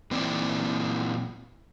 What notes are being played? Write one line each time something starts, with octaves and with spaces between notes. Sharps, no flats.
A#2 E3 C4 E4 D5